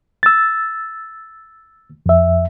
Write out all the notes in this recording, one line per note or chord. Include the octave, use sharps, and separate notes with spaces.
E6 A6
F2 E5